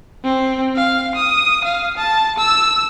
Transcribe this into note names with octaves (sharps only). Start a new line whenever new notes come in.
C4
F5
D#6
F5
A5
E6